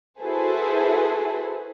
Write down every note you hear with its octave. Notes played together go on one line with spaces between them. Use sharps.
E4 F#4 G#4 A4 B4 C5